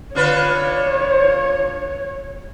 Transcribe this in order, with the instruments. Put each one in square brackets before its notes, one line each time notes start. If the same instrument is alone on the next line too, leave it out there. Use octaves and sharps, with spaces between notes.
[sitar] D3 F4 B4 [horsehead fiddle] C#5